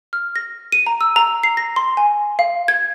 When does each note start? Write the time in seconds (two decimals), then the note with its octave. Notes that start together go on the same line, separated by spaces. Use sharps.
0.13 F6
0.36 A#6
0.72 D#7
0.86 A#5
1.01 E6
1.16 A#5
1.43 C7
1.57 A#6
1.76 C6
1.97 G#5
2.39 F5
2.68 G#6